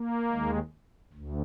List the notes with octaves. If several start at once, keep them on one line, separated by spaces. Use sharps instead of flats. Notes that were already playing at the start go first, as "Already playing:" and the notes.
Already playing: A#3
D#2 D#3 G#3
D2